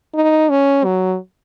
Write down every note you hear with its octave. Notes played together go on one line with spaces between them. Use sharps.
D#4
C#4
F#3